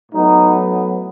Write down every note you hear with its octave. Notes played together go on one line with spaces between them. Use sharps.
A2 F#3 B3 D#4